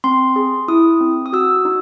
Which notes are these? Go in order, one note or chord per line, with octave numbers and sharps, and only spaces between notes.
C4 C6
G#4
E4 D#6
C4
D#6
F#4 E6
D#4